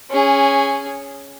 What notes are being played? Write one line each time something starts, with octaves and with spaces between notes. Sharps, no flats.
C#4 G#4